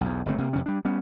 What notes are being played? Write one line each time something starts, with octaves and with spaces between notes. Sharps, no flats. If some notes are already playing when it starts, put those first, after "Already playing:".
B1 E2
G1 C#3 A3 C4
C3 A#3
F2 C3 C#4
G3 D4
G3 B3 C#4